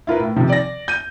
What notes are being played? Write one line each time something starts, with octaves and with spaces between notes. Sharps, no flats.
E4 F4 A#4 B4
A2
C3 D#3 F3
D5 A#6
G6 D#7